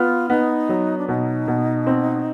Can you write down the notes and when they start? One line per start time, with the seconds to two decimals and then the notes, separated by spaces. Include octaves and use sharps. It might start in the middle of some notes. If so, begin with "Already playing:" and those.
Already playing: B3 F4
0.29 B3 D#4
0.69 F#3
0.98 D4
1.08 B2 D#4
1.48 B2
1.87 C4